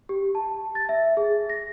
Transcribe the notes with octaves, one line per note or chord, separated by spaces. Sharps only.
G4
A5
A6
E5
G#4
A#6